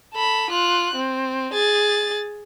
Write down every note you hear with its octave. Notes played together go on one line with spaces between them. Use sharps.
A4 B5
F4 F#6
C4
G#4 A6